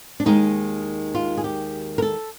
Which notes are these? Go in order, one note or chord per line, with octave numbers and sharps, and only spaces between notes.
D4
D#2 D#3 G#3 D#4
F4
G#4
G4
A#4
A4